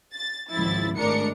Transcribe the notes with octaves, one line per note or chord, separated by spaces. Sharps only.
A6
G#1 C#2 F3 E4 A6
G#1 A2 G#3 D4 A#4 C#7